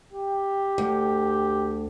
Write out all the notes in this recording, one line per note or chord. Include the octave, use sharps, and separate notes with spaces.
G4
D2